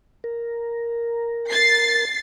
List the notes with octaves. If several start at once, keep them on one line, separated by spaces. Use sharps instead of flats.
A#4
A6 C7